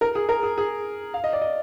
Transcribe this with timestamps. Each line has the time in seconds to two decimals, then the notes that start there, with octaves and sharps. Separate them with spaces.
0.01 A#4
0.15 G#4
0.29 A#4
0.43 G#4
0.58 G#4
1.14 F5
1.24 D#5
1.33 D5
1.42 D#5